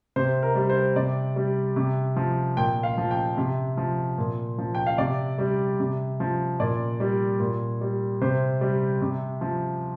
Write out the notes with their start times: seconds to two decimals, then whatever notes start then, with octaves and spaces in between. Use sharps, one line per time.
0.16 C3 C5
0.42 A#4
0.55 G3
0.70 C5
0.96 C3 D5
1.36 G3
1.76 C3
2.16 F3
2.57 A#2 G5
2.83 F5
2.98 F3
3.11 G5
3.37 C3
3.77 F3
4.18 A#2
4.58 F3
4.75 G5
4.86 F5
4.98 C3 D5
5.38 G3
5.80 C3
6.20 F3
6.60 A#2 D5
7.00 G3
7.40 A#2
7.81 G3
8.22 C3 C5
8.61 G3
9.02 C3
9.41 F3